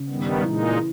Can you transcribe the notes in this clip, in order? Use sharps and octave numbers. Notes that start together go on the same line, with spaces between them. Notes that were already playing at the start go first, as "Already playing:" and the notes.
Already playing: C#3
G2 D#3 G3 B3
A#2 E3 G#3 D#4
E3